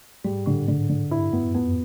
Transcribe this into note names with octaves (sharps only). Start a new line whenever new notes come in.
G#2 G3
A2 D3
G#2 D3
D3
G2 E4
F#2 B3
F2 B3